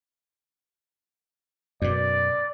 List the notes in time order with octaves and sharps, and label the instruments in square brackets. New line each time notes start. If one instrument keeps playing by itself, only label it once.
[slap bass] F#2 B2 [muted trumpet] D5